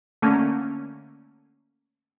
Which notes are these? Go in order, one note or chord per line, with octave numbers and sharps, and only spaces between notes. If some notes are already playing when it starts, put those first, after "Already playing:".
D3 A3 A#3 C#4